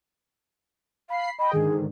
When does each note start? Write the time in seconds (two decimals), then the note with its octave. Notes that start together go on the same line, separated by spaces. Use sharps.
1.10 F5 B5 C7
1.39 D#5 G5 B5
1.53 G#2 D3 D#3 G#4